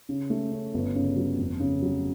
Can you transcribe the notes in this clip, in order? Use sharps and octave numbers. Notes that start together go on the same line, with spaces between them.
C#3
A3
C#4
G1
C#3
F#3
F1
C#3
F#3